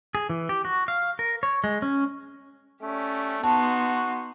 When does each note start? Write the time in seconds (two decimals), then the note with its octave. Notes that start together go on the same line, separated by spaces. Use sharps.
0.15 G#4
0.30 E3
0.49 G4
0.65 F#4
0.88 F5
1.19 A#4
1.43 C#5
1.64 G#3
1.82 C#4
2.82 A3 C#4 G4 D5
3.44 B3 D#4 F#4 A5 C6